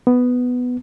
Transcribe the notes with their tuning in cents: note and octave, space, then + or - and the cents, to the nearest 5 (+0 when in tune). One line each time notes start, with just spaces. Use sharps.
B3 +5